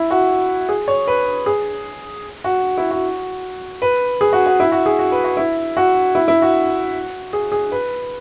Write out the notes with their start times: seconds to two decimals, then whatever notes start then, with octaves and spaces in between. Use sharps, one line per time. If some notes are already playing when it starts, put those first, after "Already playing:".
Already playing: E4
0.11 F#4
0.69 G#4
0.88 C#5
1.07 B4
1.46 G#4
2.44 F#4
2.78 E4
2.91 F#4
3.82 B4
4.21 G#4
4.33 F#4
4.46 F#4
4.60 E4
4.72 F#4
4.86 G#4
4.99 F#4
5.12 B4
5.24 F#4
5.37 E4
5.77 F#4
6.15 E4
6.28 E4
6.42 F#4
7.33 G#4
7.52 G#4
7.72 B4